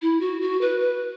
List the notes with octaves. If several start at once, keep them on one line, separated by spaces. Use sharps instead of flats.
E4
F#4
F#4
B4
B4